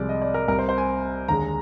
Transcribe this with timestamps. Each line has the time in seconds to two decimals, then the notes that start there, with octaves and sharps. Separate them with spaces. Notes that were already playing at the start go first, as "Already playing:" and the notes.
Already playing: C2 C3 F3 G#3 D5
0.09 D#5
0.22 D5
0.34 A#4
0.48 C2 C3 G3 A#4
0.59 C5
0.69 C5
0.78 G#5
1.28 D#2 D3 G#3 A#5